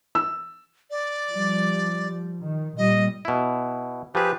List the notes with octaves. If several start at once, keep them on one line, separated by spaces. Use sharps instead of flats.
E6
D5
F3 G3
D#3
A#2 G3 D#5
B2 E4
F3 G4 G#4 B4